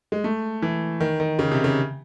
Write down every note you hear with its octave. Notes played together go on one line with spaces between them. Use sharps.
G#3
A3
E3
D#3
D#3
C#3
C3
C#3